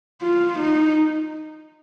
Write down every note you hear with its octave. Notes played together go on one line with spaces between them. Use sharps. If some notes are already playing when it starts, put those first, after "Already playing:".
F4
D#4